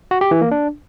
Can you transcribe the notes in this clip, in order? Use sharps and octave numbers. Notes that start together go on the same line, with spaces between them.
F#4
G4
E3
A#3
D4